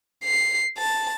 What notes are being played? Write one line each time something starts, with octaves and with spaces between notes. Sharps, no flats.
C7
A5